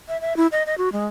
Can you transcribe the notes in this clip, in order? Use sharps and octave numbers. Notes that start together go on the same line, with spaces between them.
E5
E5
E4
D#5
D#5
F#4
G#3